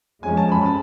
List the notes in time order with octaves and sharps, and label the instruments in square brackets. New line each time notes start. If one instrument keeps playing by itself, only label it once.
[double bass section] F2 F3 G#3 C#4 [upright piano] G#5
[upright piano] A5
B5
A5